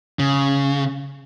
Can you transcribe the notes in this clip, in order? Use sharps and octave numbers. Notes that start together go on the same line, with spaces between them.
C#3